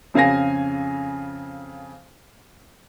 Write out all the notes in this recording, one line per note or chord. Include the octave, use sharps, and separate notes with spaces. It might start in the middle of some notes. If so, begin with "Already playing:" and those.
F2 C#3 F5 G#5 A#6